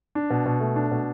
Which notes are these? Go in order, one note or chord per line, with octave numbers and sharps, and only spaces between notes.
D4
B2
B2
A3
D4
B2